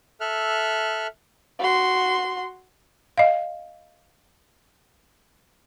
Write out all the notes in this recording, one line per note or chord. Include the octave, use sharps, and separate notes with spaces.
A4 E5 F6 F#6
F#4 C6
D#5 F5